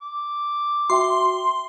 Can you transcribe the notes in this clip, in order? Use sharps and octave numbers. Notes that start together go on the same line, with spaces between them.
D6
F#4 E5 G5 C6